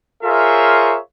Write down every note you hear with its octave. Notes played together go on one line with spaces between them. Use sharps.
F4 G#4 A#4 C5 C#5 E5